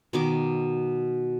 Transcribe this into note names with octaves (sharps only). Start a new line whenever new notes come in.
B2 D#3 D6